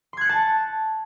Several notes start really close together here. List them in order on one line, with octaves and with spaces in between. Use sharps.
C6 G#6 F#6 C#7 A5